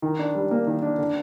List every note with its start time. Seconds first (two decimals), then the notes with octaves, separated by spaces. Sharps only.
0.02 D#3
0.19 D4
0.35 G3
0.51 A#3
0.67 D#3
0.82 D4
0.98 D3